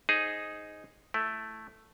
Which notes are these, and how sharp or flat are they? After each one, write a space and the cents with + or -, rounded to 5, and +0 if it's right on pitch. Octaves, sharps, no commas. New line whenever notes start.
D#4 +0 G#4 +0 C5 +0
A3 +0 E4 +5